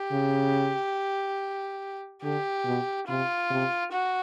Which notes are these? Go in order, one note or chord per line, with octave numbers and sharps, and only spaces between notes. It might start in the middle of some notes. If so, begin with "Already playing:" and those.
Already playing: G4
C#3
D3 G4
B2
C3 F4
C3
F#4